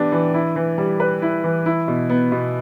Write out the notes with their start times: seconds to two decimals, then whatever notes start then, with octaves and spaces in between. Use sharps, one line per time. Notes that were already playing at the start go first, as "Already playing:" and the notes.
Already playing: E3 B3 D4 G4
0.12 E3
0.34 E4
0.56 E3
0.78 G3
1.00 B4
1.22 E4
1.44 E3
1.66 E4
1.88 B2
2.10 B3
2.32 B2